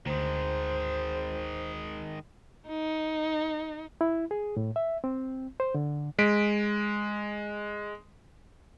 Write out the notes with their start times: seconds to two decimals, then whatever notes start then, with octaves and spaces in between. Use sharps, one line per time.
0.06 D2 D#3 G#3 C5
2.68 D#4
4.01 E4
4.31 G#4
4.57 A2
4.76 E5
5.04 C4
5.60 C5
5.75 D3
6.19 G#3 B6 D7